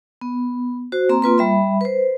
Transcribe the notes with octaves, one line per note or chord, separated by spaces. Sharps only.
B3
F#4 C5
A#3 C4 A#5 C6
A#3 F4 B4 C6
G3 E5 B5
B4 C5